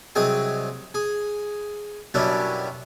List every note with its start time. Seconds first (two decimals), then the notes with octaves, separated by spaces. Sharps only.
0.15 C2 F#3 C4 G#4 D#5
0.94 G#4
2.14 F#2 B2 G3 C#4 D4 E4